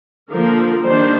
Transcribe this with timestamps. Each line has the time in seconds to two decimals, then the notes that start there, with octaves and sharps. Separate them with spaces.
0.29 D3 F3 A#3 A#4
0.83 D#3 G3 A#3 D4 C5